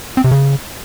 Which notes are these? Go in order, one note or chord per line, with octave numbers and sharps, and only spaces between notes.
C4
C3
C#3